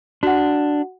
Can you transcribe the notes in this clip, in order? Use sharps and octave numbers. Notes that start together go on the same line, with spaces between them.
D4 F#4 F#5